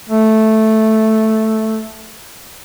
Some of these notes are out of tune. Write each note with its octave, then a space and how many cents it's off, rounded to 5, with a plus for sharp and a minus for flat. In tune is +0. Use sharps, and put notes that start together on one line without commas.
A3 -5